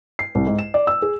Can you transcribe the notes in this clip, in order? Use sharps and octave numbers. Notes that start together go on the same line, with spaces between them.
C7
C2
G#2
E7
D5
E6
G#4